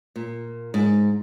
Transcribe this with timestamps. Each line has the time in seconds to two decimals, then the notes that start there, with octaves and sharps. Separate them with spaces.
0.16 A#2
0.74 G#2